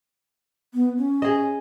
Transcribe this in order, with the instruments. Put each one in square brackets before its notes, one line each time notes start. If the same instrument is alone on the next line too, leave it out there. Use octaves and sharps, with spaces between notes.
[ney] B3
C#4
[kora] G#4 D#5